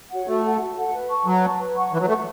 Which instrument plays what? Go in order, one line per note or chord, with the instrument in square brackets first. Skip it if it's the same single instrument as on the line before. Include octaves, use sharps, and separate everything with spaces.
[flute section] F#4 C#5 F#5
[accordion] A3 [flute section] F#4
[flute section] A4 F#5 A5
F#4
A4 F#5 A5
B4
A5 C#6
[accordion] F#3 [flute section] B4
[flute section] A5 C#6
B4
F#5 C#6
[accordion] E3 [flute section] B4
[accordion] F#3
[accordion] A3 [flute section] F#5 C#6